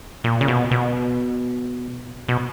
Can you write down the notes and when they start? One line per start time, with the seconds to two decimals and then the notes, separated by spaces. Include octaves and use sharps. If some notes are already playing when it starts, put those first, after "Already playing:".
0.24 A#2
0.41 C#3
0.48 B2
0.71 B2
2.28 B2